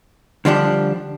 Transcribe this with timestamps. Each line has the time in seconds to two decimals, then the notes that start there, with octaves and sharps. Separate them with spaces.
0.45 D3 F3 G3 D4